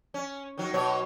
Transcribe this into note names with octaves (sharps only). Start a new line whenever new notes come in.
C#4
D#3 F#3
B2 F#3 C#5